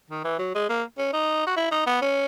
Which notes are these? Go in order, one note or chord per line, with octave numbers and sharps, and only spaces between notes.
D#3
E3
F#3
G#3
A#3
C#4
D#4
F#4
E4
D#4
B3
C#4